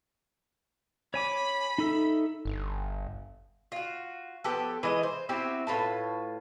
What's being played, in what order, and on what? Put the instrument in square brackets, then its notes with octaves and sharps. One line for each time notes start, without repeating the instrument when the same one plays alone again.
[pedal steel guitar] C#5 G#5 D6 [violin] B5
[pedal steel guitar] D#4 A4 E5
[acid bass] G1
[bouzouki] F4 F#4
F3 B3 G4 A4
E3 G#3 D#5
C5
C4 E4 F#4 G4
A2 F4 B4 A5